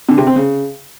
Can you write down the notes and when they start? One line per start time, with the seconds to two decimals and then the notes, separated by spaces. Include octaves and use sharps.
0.09 D3
0.18 C3
0.27 C4
0.36 C#3